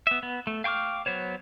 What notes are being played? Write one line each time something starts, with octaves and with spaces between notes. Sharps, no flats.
B3 E5
B3
A3
F5 G5 C#6 D6 F6
F#3 B3 C5 C#5